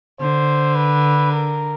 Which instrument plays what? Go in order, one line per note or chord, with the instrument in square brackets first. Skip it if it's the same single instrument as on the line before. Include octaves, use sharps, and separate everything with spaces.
[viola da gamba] D3 [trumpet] C5
[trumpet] B4
A#4